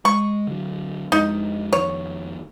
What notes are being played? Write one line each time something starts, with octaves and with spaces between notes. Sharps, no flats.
G#3 C#6
D3 F#3
F2 G#3 D#4
F2 D#3 C#5